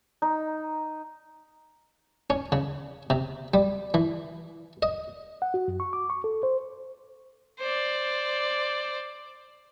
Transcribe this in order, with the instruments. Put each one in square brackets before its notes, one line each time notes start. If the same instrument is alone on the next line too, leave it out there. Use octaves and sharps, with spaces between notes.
[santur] D#4
[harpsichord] C#4
C#3
C3
G3
E3
D#5
[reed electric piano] F#5
F#4
F#2
C#6
D6
C#6
A4
C5
[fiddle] C5 D5